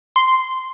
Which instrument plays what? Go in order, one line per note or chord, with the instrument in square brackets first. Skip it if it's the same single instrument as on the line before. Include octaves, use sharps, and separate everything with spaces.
[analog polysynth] C6